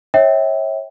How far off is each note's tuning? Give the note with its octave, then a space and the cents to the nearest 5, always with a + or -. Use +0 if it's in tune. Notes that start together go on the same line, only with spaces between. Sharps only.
C#5 -25 E5 -30 G5 +0